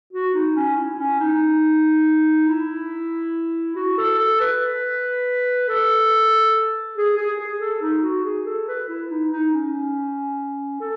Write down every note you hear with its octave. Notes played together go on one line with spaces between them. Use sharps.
F#4
D#4
C#4
E4
C#4
D#4
E4
F#4
A4
A4
B4
A4
G#4
G#4
G#4
A4
D#4
F#4
G#4
A4
B4
E4
D#4
D#4
C#4
A4